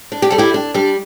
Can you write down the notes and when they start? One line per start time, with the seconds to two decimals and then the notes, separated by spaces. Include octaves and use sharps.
0.12 D4
0.22 G4
0.30 G3 A4
0.38 E4 G4
0.54 D4
0.74 G3 D4